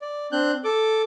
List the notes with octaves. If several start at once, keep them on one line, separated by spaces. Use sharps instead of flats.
D5
C4 D4 F#6 G6
A4 D6